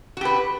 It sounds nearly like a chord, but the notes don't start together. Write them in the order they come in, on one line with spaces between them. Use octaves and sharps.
F#4 G4 B4